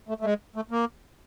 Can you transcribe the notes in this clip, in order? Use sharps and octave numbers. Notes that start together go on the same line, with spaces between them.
A3
A3
G#3
A3
A#3